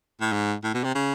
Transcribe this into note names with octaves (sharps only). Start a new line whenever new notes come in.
A2
G#2
A2
B2
C3
C#3